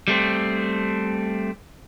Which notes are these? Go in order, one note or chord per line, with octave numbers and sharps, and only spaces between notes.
G3 A3 C4